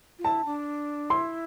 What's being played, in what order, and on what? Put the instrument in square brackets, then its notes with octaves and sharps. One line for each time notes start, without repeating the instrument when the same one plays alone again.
[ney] F4
[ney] E4 [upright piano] A5
[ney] D4
[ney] E4 [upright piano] C6